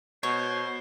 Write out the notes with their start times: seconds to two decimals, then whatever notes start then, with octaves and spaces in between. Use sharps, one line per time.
0.23 B2 C5 C#5